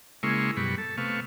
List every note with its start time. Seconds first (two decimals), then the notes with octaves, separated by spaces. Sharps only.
0.23 C#3 G#3 A#3 E4 C6 C#6
0.57 F#2 B2 G3 B5 C#6
0.78 A4
0.98 C3 A3 B3 F5 C#6